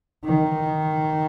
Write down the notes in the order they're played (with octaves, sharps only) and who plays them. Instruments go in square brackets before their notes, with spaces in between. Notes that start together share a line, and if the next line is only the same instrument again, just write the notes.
[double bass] D#3